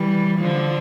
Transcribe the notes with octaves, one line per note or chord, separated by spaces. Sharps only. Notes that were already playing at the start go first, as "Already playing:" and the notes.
Already playing: E3 G3
D3 F3